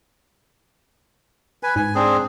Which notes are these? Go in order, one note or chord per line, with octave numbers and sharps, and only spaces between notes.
B4 G#5
G#2 G#5
C4 D4 G#4